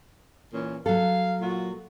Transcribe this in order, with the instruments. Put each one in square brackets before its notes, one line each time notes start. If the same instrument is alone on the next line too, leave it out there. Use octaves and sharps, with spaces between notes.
[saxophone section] A#2 E3 C#4
[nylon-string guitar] F#3 A4 [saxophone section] F5
[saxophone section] A#2 F4 F#4